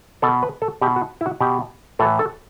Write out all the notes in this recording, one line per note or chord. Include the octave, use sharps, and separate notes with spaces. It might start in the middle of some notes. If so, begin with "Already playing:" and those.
B2 A4
B4
A4
B2 G4
F#4
E4
F#4
B2 G4
A2 E3 A4
A4